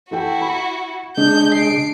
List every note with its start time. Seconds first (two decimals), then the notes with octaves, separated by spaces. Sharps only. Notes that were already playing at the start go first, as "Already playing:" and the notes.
0.11 E3 E4 F#4 A4 G5
0.41 B5
1.17 C#3 G#3 D4 G6
1.54 C7 D7